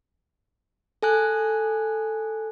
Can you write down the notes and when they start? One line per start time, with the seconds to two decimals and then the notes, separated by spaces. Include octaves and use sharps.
1.03 A4 G#5 F#6